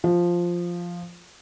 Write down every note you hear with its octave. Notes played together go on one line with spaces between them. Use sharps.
F3